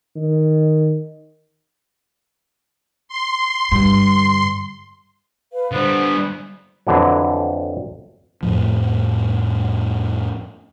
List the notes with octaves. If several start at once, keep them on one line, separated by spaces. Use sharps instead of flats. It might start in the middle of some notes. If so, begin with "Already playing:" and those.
D#3
C6
G2 D3
B4 F5
D3 G3 B3 C5
F2 D3 E3 F#3
F2 A2 F3